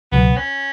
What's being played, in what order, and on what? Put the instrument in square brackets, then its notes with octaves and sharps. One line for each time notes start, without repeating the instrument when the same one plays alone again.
[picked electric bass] C#2 B2 F#3 [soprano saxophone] B3
[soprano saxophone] C#4